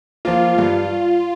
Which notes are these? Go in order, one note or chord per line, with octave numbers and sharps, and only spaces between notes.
F3 A#3 F4
G2 F4